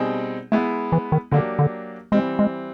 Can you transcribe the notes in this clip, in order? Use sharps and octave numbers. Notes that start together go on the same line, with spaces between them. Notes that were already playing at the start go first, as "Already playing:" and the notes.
Already playing: B2 G3 C4 D#4 G#4
G#3 A3 B3 E4
E3
D#3
D3 F#3 A#3 D4 G4
D3
E3 G3 G#3 C4
G#3